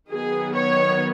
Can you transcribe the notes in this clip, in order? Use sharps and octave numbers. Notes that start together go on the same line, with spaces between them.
D#3 F#3 B3 G#4
C#5